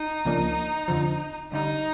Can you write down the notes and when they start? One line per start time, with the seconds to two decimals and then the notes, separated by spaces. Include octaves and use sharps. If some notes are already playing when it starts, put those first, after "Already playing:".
Already playing: D#4
0.25 C#2 C#3 F3 A#3 D4
0.88 F2 D3 F3
1.52 G2 D3 G3 D#4